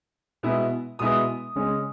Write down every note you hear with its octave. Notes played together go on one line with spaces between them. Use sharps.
B2 G#3 B3 E4
B2 G#3 B3 E4 D#6
C#3 G#3 C#4